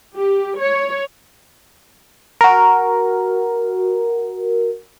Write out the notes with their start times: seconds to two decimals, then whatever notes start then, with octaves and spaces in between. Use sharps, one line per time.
0.16 G4
0.58 C#5
2.41 F#4 A#4